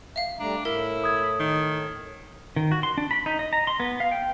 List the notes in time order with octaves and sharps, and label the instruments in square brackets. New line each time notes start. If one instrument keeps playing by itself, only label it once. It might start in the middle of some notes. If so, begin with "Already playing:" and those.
[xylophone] E5 F5
[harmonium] G3 A3 A#5 [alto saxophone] D4
[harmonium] A2 [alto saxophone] E4 [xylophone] A#4
[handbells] D#6 G#6
[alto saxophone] D#3
[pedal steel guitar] D#3
F#4
C6
D4
B5
D#4
D#5
A#5
C6
B3
F5
G5